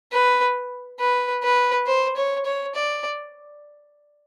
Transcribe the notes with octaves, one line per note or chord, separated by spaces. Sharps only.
B4
B4
B4
C5
C#5
C#5
D5